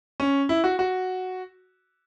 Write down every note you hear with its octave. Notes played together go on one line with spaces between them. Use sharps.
C#4
E4
F#4
F#4